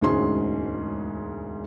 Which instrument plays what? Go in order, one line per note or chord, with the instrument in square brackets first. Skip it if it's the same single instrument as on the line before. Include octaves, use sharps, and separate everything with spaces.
[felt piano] E1 D2 G#2 C#4 G#4 C6